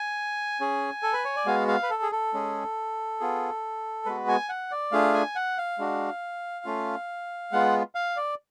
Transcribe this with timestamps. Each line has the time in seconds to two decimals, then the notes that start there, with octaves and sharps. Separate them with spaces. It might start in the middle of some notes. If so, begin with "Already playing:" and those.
Already playing: G#5
0.60 C#4 G#4
1.03 A4
1.13 B4
1.25 C#5
1.36 D5
1.46 G#3 B3 F#4 F5
1.68 F5
1.83 B4
1.90 A4
2.02 G#4
2.12 A4
2.34 G#3 C#4 G#4
3.20 B3 F4 G#4
4.06 G#3 B3 F#4 B4
4.28 G#5
4.49 F#5
4.71 D5
4.92 A3 D4 F4 G#4 F5
5.14 G#5
5.36 F#5
5.58 F5
5.79 G#3 D4 F#4
6.65 A3 C#4 F4
7.52 G#3 B3 F4 F#5
7.95 F5
8.17 D5